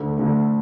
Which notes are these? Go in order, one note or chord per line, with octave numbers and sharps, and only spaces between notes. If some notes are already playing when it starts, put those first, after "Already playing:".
Already playing: D2 D3 A3
D2 D3 A3